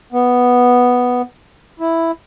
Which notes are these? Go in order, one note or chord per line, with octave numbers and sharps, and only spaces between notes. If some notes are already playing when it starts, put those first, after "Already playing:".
B3
E4